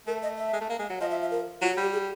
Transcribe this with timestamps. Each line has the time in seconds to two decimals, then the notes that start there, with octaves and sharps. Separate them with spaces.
0.07 A3 A#4
0.23 D#5
0.38 E5
0.53 G#3
0.61 A3
0.70 A#3
0.79 G#3
0.90 F#3
1.01 F3 D#5
1.11 E5
1.21 E5
1.31 A#4
1.62 F#3 F4
1.72 F#4
1.77 G3 G4
1.93 G#4